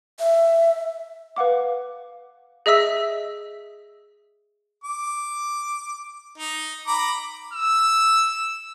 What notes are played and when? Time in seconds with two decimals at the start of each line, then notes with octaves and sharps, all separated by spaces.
0.19 E5
1.36 B4 F5 F#5 D6
2.66 G#4 D#5 E5 E6 B6
4.84 D6
6.38 D#4
6.87 A#5 B5 D6
7.54 E6